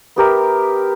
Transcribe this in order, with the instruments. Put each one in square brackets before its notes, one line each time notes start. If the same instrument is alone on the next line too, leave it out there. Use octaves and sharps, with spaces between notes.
[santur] B3 G4 A#4 E5